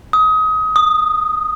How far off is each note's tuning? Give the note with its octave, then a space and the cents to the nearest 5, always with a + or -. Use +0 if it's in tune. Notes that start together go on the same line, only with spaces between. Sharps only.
D#6 +25
D#6 -10